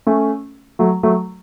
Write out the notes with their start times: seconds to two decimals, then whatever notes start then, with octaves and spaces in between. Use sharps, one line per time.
0.06 A3 C#4
0.79 F#3 A3
1.03 F#3 A3